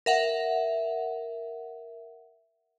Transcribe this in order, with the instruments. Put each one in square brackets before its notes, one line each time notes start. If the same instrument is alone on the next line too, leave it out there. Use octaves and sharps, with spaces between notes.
[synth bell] A#4 E5 F#5